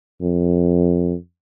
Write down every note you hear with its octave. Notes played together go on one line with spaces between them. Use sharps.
F2